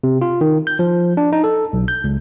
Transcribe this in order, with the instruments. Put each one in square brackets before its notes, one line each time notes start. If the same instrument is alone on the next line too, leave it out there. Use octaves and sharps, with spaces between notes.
[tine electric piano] C3
F4
D#3
G6
F3
D4
D#4
A4
B1
G6
C#2